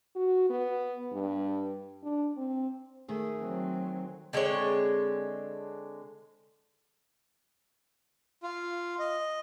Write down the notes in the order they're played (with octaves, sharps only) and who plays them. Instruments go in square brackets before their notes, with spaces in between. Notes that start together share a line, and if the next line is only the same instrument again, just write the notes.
[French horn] F#4
B3
G2
D4
C4
[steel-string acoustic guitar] D#3 A3 G#4
[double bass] F#3 C4
[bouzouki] D3 G#3 C4 C#5
[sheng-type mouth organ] F4
D#5